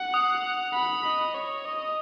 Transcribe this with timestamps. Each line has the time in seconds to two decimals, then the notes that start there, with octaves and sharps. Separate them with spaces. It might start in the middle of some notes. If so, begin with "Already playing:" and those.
Already playing: F#5
0.14 D#6
0.74 B5
1.05 D#5
1.34 C#5
1.65 D#5